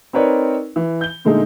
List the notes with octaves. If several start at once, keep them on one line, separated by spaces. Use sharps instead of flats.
C4 D#4 A#4 B4 C#5 D5
E3
G6 G7
A#2 D3 G#3 A3 D#4 G#4